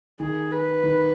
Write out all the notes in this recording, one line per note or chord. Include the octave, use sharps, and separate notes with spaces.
D#3 G#4
B4
D#3